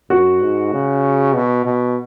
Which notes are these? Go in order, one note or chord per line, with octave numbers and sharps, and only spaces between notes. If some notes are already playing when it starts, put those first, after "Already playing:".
F#2 F#4
G#2
C#3
B2
B2